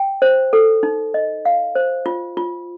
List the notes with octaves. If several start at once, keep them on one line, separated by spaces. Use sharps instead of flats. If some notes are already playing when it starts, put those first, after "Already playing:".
Already playing: G5
C5
A4
D#4
D#5
F5
C5
F4
F4